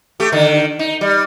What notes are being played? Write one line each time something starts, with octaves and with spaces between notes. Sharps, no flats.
A3 G4
D3 D#3
D#4
G3